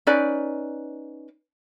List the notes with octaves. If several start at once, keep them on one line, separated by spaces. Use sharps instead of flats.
C#4 D#4 B4 D5